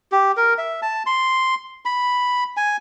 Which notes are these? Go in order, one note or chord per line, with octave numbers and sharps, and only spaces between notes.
G4
A#4
E5
A5
C6
B5
G#5